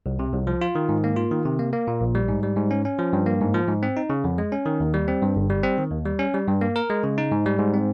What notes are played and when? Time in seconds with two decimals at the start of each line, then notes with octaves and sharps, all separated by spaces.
0.06 C2
0.19 C3
0.33 C2
0.47 F3
0.61 F4
0.75 D#3
0.89 G#2
1.04 A#3
1.17 F4
1.31 D#3
1.45 C3
1.59 A#3
1.73 A#3
1.87 A#2
2.01 A#1
2.15 G3
2.29 G#2
2.43 G3
2.56 G#2
2.71 C#4
2.85 C#4
2.99 F3
3.13 G2
3.26 A#3
3.41 G#2
3.54 F3
3.68 G#2
3.83 C4
3.97 D#4
4.10 C#3
4.24 F2
4.38 G#3
4.52 C#4
4.66 D#3
4.80 D#2
4.94 G3
5.08 C4
5.22 G2
5.36 G1
5.50 G3
5.63 C4
5.78 D#3
5.91 D#2
6.05 G3
6.19 C#4
6.34 G3
6.47 G2
6.61 A#3
6.76 A#4
6.90 G#3
7.03 C#3
7.18 D#4
7.32 G#2
7.46 G3
7.59 G#2
7.74 C4